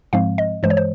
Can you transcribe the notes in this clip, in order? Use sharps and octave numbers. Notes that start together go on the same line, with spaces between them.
G#2 F3 G#3 C4 F5
D#5
G2 E3 G#3 C5
C#5
C5